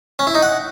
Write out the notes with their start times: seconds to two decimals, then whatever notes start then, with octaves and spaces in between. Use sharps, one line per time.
0.19 C#4
0.27 E4
0.35 D#4
0.43 F#5